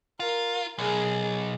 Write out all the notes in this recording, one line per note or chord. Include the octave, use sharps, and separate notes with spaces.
F4 A#4
B1 G#4